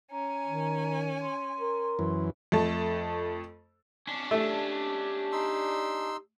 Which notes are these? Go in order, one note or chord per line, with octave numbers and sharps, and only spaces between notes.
C#4 G#5 A#5
D#3
C6
A#4
F#2 E3
F2 A3 A4 A5
C#4 D4
A3 G4
D#4 C6 E6